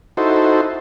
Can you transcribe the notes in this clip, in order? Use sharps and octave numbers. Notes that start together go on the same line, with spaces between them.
D#4 E4 F#4 A4 C5